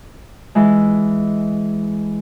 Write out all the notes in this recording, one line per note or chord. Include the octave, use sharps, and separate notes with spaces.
E3 G#3